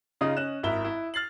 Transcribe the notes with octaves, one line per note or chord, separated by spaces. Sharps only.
C#3 D#4 F4 D#5 D#6
C#4 D#5 F#6 E7
G#1 E4 A#4 E5 E6 G7
E4
F6 A6 C7 F#7